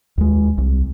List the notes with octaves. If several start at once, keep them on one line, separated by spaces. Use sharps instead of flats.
D#2 G#3
C2